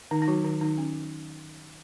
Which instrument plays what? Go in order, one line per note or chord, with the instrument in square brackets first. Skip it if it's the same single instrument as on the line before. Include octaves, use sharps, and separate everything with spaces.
[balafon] D#3 D#4
D#4
F#3 F#4
D#3 D#4
D#3 D#4
C#4